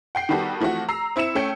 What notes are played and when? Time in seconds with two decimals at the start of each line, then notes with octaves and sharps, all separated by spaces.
0.15 F#5 G5 C7
0.29 D#3 G3 B3 F#4 G4 A4
0.60 E3 F3 A3 C4 F#4
0.89 A#5 E6 C7
1.16 C4 E4 E6 C#7 E7
1.35 A3 C#4 G5 G6 C#7